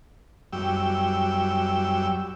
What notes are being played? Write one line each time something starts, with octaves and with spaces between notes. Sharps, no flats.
F#2 G3 G5 E6